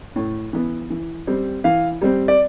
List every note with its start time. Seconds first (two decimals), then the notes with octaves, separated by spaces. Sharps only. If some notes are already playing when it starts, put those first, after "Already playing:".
0.16 A2
0.53 E3 B3
0.90 E3
1.27 G3 C4
1.64 E3 F5
2.02 G3 C4
2.28 D5